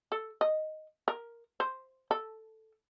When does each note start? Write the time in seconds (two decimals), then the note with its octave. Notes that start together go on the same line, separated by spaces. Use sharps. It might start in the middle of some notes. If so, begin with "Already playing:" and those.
0.12 A4
0.41 D#5
1.08 A#4
1.60 C5
2.11 A4